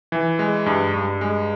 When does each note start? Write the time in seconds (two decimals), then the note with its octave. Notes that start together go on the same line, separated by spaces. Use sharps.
0.12 E3
0.39 G#3
0.66 G2
0.94 G2
1.21 G#3